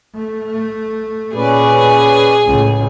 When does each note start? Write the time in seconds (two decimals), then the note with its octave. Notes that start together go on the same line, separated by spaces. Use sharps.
0.15 A3
1.35 A#2 C#4 G#4 B4 D5
2.46 C#2 A2